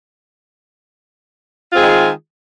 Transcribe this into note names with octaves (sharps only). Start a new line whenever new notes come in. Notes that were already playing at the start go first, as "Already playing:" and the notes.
D#3 G#3 C4 F4 G#4